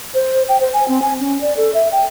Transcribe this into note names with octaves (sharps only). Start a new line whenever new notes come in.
C5
G5
C5
G#5
C4
G#5
C#4
D5
A4
E5
G5